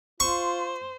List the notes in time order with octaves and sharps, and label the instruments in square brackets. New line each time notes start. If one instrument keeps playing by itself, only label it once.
[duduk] F4 [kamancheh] C5 [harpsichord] C#6